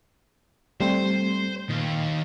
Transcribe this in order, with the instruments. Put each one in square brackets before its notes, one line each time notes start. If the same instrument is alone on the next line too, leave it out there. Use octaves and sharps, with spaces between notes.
[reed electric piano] G3 A3 C4 [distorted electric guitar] C5
[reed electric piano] A#2 [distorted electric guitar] D#3 F5